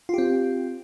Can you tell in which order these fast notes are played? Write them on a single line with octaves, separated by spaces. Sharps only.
F4 G4 C4